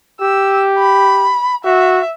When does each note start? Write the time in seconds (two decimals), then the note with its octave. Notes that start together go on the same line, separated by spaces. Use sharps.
0.21 G4 E6
0.79 B5
1.65 F#4 E5